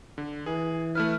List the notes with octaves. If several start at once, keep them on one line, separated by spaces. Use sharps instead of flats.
D3
E3 G#4
A3 E4 B4 F6